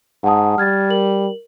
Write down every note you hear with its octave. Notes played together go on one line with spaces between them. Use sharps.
G#2 F#5 A5 D#6
G3 F6 G#6 A6
A#4 F#7